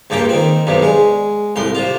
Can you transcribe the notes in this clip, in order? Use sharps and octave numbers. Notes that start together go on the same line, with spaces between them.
C#2 G2 A#3 G5
D#3 C4
B1 G2 C3
G#3
C2 A2 C6
C3 F4